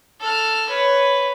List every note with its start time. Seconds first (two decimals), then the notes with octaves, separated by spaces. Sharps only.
0.21 A4 F6
0.69 B4 C#5